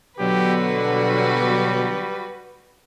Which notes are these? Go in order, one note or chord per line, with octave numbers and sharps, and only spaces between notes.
B2 D3 F#3 F#4 G4 B4
G3